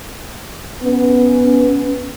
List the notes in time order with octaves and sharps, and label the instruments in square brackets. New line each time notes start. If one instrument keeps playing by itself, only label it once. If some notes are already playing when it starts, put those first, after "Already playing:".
[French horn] B3 [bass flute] C#4